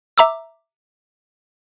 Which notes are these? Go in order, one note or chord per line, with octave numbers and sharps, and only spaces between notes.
E5 A#5 D6 E6